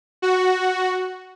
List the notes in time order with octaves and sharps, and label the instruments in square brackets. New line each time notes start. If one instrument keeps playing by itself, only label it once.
[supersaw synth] F#4